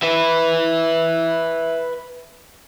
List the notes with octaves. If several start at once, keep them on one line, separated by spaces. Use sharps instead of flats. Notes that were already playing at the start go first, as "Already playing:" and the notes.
B4 E5